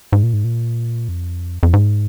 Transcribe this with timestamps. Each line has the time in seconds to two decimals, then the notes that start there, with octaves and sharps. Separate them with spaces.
0.12 G#2
0.23 A#2
0.33 G#2
0.44 A#2
1.09 F2
1.63 F2
1.73 G#2